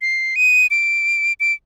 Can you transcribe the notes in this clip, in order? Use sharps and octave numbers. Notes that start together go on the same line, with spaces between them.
C7
D#7
D7
D7